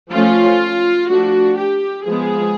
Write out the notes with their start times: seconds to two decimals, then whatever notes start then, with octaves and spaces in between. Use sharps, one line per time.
0.12 F3 A3 C#4 F4
1.10 F3 A3 D4 F#4
1.58 G4
2.06 F3 G#3 B3 G#4